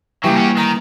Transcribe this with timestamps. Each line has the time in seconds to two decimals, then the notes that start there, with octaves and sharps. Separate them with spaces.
0.24 C#3 E3 F#3 G3 A#3 G4
0.37 C#4 F#4
0.57 D#3 A#5